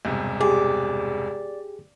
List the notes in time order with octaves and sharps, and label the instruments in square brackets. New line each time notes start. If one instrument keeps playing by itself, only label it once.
[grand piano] E1 G2 C3
[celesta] G4 G5 [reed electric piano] G#4 [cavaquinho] D5